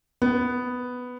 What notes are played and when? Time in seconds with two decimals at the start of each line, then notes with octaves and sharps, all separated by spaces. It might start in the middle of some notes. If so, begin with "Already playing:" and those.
0.22 B3